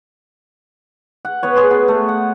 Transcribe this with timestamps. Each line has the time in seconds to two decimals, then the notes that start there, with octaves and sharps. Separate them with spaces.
1.25 F#5
1.43 B3 B4 C#5
1.56 G#4 C#5 C6
1.71 B3
1.88 A3
2.08 F#5